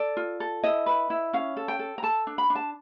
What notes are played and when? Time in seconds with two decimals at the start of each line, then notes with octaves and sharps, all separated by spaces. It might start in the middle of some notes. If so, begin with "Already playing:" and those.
Already playing: A4 D5
0.17 F4
0.40 A4
0.63 E4 D#5
0.86 B4
1.10 E4
1.33 C#4 F5
1.57 A4
1.68 G5
1.79 A4
1.98 A#5
2.03 A4 A5
2.27 D4
2.38 B5
2.50 D4
2.55 A5